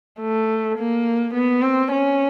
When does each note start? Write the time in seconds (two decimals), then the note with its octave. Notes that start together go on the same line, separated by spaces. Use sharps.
0.21 A3
0.78 A#3
1.35 B3
1.62 C4
1.92 C#4